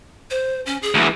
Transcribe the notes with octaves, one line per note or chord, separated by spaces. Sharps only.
C5
C#4
G#4
D2 E3